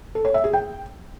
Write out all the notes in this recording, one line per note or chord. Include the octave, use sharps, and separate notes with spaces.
A4
C#5
E5
G#4
G5